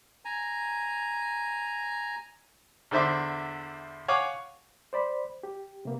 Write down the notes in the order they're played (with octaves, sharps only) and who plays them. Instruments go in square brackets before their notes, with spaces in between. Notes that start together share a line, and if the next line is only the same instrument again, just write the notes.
[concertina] G#5 A#5
[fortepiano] E2 D3 C5 E5 D6
C#5 F5 F#5 G#5 D6
[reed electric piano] C5 D5 B5
G4
C3 A#3 B3